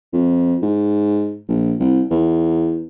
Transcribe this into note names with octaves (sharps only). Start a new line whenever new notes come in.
F2
G#2
A#1
C2
E2